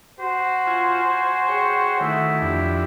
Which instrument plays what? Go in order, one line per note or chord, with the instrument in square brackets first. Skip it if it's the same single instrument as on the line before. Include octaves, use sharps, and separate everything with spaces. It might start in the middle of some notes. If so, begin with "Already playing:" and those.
[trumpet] F#4 [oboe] C5
[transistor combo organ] F4 G#5
G#5
G#4 C#5 G5
[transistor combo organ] D#3 A3 [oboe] E4
[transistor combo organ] F2 D4 G4